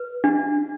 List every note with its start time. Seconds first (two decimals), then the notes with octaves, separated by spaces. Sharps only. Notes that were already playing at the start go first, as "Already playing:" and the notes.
Already playing: B4
0.24 D4